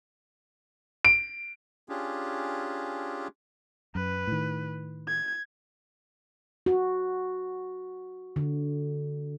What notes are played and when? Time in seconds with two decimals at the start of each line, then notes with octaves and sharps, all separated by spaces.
1.05 D7
1.89 C#4 D4 F4 G4 G#4
3.95 F#2 B4
4.27 A2 D#3
5.07 G#6
6.66 F#4
8.36 D3